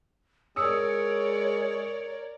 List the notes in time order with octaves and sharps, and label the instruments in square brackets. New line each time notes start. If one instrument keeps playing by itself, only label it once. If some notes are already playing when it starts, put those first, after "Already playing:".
[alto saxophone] G#3 [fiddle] A#4 D5 [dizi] C#5 [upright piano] D#6 E6 C#7